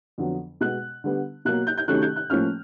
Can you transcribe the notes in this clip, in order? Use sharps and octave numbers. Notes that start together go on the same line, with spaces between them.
F2 D3 F#3 B3
B2 G#3 B3 F#6
D3 G3 B3
B2 F#3 A#3 F#6
G6
G6
C3 D#3 F#3 A3 C#4 F#6
G6
F#6
A2 F3 A#3 C#4 F6